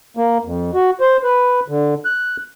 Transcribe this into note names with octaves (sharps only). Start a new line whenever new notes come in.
A#3
F2
F#4
C5
B4
D3
F#6